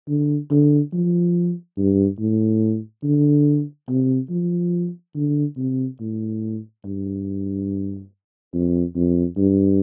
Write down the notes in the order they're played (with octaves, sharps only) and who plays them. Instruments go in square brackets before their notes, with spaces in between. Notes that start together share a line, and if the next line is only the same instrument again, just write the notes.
[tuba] D3
D3
F3
G2
A2
D3
C3
F3
D3
C3
A2
G2
F2
F2
G2